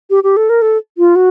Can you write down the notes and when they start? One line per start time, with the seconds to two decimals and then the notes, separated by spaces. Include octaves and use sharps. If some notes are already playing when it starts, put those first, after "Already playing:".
0.10 G4
0.24 G4
0.37 A4
0.49 A#4
0.62 A4
0.98 F4
1.16 F#4